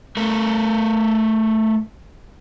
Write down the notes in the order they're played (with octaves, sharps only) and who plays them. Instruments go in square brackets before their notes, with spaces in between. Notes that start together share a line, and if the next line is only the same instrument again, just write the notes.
[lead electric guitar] A3 A#4